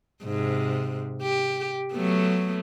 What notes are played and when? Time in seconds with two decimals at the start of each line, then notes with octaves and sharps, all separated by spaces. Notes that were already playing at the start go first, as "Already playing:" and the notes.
0.24 G#2 C3
1.22 G4
1.93 F#3 A3 B3